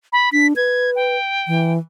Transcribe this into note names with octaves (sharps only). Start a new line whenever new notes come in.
B5
D4 B6
B4 G#6
G5
E3